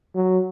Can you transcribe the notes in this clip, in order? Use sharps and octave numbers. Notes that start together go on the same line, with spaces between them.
F#3